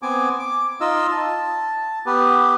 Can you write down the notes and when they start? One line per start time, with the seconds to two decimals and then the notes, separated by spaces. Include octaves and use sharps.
0.02 B3 C4 G#5 D6
0.39 D6
0.81 D#4 F4 D#5 E6
1.12 A5
2.06 B3 G4 B4